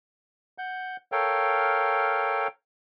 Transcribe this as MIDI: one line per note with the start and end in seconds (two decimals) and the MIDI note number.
0.58 0.97 78
0.58 0.97 91
1.12 2.48 69
1.12 2.48 70
1.12 2.48 73
1.12 2.48 77
1.12 2.48 79